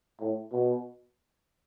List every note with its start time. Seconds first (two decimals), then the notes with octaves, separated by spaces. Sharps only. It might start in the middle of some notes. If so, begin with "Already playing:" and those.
0.20 A2
0.52 B2